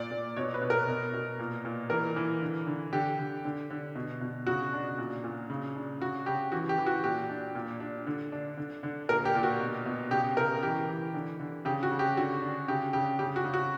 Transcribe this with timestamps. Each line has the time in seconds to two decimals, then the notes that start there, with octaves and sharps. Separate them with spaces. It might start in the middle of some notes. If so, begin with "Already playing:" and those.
Already playing: A#2 D5
0.11 A#2
0.36 B2 C#5
0.54 B4
0.61 B2
0.70 A#4
0.87 B2
1.13 B2
1.39 A#2
1.65 A#2
1.90 E3 A#4
2.16 E3
2.42 D3
2.67 D3
2.93 D3 G4
3.19 D3
3.45 D3
3.70 D3
3.95 B2
4.21 B2
4.47 C#3 F#4
4.73 D4
4.98 A#2
5.24 A#2
5.50 C#3
5.76 D4
6.01 C#3 F#4
6.26 C#3 G4
6.52 E3 F#4
6.69 G4
6.78 E3
6.86 F#4
7.04 A#2 G4
7.30 D4
7.55 A#2
7.80 D4
8.07 D3
8.32 D4
8.57 D3
8.83 D3
9.09 A#2 A#4
9.25 G4
9.35 A#2
9.43 F#4
9.60 B2
9.86 B2
10.11 C#3 G4
10.37 C#3 A#4
10.63 E3 G4
10.88 E3
11.14 D3
11.40 D3
11.65 C#3 G4
11.83 F#4
11.91 C#3
11.99 G4
12.17 D3 F#4
12.42 D4
12.68 C#3 G4
12.93 C#3 G4
13.19 C#3 G4
13.36 F#4
13.44 C#3
13.54 F#4